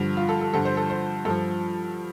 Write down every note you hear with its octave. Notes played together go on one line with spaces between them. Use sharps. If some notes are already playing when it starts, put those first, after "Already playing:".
Already playing: G2 D3 F3
F4
A4
A4
G2 D3 F3 A4
C5
A4
C5
G2 F3 A4